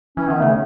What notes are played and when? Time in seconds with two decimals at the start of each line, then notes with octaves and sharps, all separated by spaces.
0.17 E3 C#4
0.28 D#3 B3
0.39 C#3 A3